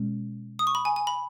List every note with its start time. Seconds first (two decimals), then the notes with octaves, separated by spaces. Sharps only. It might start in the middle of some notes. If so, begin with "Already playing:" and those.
Already playing: B2 G#3 C#4
0.59 D#6
0.67 C#6
0.75 B5
0.85 G#5
0.96 G#5
1.07 B5